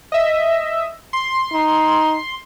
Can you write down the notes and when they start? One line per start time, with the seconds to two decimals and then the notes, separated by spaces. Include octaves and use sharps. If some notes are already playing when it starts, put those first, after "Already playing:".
0.12 D#5 E5
1.13 C6
1.53 D#4